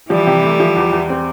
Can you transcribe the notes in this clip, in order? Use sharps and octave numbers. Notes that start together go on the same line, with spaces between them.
E3 F3 G3
C3
A3
F3
E2
E2
C4